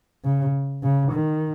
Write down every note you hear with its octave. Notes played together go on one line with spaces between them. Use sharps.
C#3
C#3
D#3